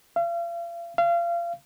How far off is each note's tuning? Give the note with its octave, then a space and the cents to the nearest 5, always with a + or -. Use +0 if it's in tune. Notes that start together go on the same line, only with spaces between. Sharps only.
F5 -40
F5 -30